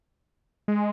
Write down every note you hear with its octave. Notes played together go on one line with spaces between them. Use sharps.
G#3